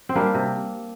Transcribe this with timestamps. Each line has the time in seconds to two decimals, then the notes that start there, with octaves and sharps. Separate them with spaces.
0.09 C4
0.15 G3 A#3 D4
0.34 C3